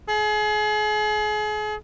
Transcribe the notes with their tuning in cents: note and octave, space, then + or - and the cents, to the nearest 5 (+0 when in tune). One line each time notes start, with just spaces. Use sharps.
G#4 +35